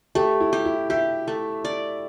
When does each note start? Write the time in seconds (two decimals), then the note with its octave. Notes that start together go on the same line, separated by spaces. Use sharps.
0.15 A3 G4
0.41 E4
0.53 G4
0.65 E4
0.90 G4 E5
1.28 A3
1.65 D5